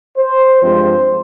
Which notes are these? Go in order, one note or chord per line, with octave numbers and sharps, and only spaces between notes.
C5
G2 F3 G#3 C4 C5